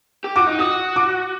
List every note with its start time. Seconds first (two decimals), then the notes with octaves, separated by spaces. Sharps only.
0.24 G4
0.36 F#4 D6
0.47 D#4
0.59 F#4 D#6
0.96 D6